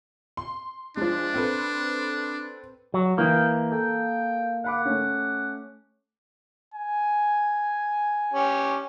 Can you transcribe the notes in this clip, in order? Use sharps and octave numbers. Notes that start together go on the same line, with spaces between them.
C6
F3 G#3 D4
C4 A4 B4
F#3
E3 A#3 G5 D#6
A4 G5
F5 F#5 B5 D6
A3 C#4
G#5
C#4 G4